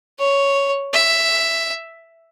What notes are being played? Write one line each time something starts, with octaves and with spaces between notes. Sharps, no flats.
C#5
E5